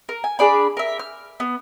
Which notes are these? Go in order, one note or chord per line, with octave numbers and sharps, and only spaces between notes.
A#4
G#5
D4 G#4 D5 B5
A#4 E5
F6
B3